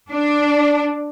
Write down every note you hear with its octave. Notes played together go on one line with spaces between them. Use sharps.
D4